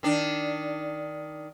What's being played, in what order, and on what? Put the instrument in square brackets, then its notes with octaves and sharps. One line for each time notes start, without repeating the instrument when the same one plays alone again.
[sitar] D#3 D4